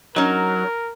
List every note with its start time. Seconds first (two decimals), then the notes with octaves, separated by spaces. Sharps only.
0.16 F#3 C#4 D#4 A#4